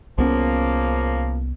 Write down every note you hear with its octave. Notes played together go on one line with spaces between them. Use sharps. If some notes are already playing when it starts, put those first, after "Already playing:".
C2 C#3 F3 A#3 B3 C#4